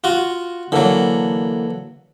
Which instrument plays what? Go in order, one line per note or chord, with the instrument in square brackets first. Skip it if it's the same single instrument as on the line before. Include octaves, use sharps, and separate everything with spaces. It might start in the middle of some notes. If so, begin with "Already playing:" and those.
[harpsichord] F4 F#4
[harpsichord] D3 F#3 [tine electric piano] E3 A#3 A4